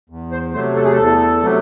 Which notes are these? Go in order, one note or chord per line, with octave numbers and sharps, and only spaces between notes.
E2
C5
C3 F#3 A3 C5
A4
G#4
A4
E2
C3 F#3 A3